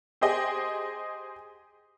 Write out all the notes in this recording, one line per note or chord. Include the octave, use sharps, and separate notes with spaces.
G4 G#4 C5 D#5 G5 G#5